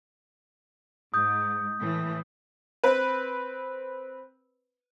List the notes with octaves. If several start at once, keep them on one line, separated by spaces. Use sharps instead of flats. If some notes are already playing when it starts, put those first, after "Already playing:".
G#2 D#6 G6
A2 E3
C4 B4